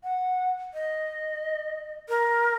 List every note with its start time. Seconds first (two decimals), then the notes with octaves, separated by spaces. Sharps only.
0.03 F#5
0.74 D#5
2.09 A#4